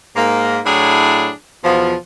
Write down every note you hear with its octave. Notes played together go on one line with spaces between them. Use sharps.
G#2 A#3
A2 F#3 D4 E4 G#4
E2 B2 F3